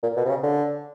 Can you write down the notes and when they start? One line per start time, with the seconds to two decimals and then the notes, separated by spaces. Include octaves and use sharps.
0.03 A#2
0.17 B2
0.26 C3
0.29 C#3
0.43 D3